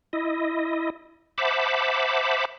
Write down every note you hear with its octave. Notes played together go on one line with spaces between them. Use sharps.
E4 D#5
C5 E5 F#5 A5 B5 D6